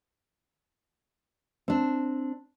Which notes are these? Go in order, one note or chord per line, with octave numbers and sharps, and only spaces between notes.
C4 D4